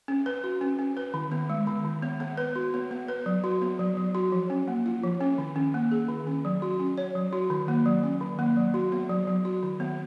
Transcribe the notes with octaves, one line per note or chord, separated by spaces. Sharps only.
C#4
B4
F#4
C#4
C#4
B4
D#3
B3
G#3
D#3
D#3
B3
B3
B4
F#4
B3
B3
B4
F#3
F#4
B3
F#3
F#3
F#4
F3
C#4
A#3
F4
F3
C#4
D#3
C#4
A#3
G#4
D#3
C#4
F#3
F#4
C#4
C#5
F#3
F#4
D#3
A#3
F#3
C#4
D#3
A#3
F#3
F#4
B3
F#3
F#3
F#4
D#3
B3